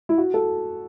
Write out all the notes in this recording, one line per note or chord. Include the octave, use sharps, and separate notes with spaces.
E4
F#4
A4